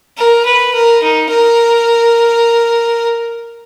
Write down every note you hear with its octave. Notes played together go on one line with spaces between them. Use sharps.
A#4
B4
A#4
D#4
A#4